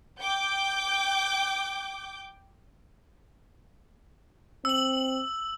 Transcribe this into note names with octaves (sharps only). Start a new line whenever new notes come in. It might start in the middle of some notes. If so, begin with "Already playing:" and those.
G5 D6 G6
C4 E6 F#7